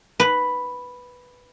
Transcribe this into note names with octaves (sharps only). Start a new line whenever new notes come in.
B4